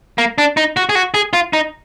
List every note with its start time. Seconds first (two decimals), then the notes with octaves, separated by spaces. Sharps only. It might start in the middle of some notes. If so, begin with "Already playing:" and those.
0.18 A#3
0.38 D4
0.57 D#4
0.77 F#4
0.89 G#4
0.95 F#4
1.14 G#4
1.33 F4
1.53 D#4